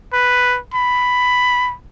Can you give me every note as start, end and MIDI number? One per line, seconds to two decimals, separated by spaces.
0.13 0.58 71
0.74 1.74 83